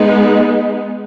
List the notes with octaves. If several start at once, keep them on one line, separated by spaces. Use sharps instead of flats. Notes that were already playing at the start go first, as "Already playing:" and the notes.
Already playing: G#3 B3 D#4